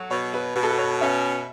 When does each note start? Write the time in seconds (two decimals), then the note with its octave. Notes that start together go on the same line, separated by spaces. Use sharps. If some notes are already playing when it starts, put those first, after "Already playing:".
Already playing: F#3 A4 C#5
0.11 B2 C#5
0.34 B4
0.56 B2 F#4
0.63 A4
0.71 B4
0.78 C#5
1.01 C#4 E5